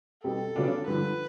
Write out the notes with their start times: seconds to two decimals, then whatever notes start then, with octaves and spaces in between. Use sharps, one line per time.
0.24 B2 G3 C4 A4
0.56 C#3 F#3 B3 D4 F4
0.87 G2 D3 F3 B4